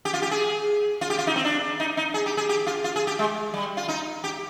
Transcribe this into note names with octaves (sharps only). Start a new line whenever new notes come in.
G4
F4
G4
G#4
F4
G4
F4
D#4
C4
D4
D#4
D#4
G#4
G4
G#4
G4
F4
F4
G#4
G4
G#3
G3
F4
D#4
G4